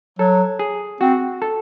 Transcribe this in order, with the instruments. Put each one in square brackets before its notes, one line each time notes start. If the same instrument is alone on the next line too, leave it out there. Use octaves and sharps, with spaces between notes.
[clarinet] F#3 [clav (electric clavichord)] A4
[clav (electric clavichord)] G#4
[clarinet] C4 [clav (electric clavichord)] F#4
[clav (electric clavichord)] A4